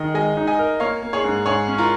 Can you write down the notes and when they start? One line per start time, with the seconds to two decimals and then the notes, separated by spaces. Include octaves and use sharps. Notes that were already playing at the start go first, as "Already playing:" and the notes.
Already playing: D#3 G#4 D#5
0.14 G#3 D#5 G#5
0.37 D#4
0.47 D#5 G#5
0.59 A#4
0.80 A#3 C#5 F5
1.03 A#3
1.13 G#4 C#5
1.24 G#2
1.46 G#2 G#4 C#5
1.68 C#4
1.78 F4 A#4